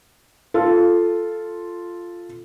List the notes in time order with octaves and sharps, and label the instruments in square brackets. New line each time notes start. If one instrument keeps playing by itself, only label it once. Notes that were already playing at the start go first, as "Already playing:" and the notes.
[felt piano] F4 A4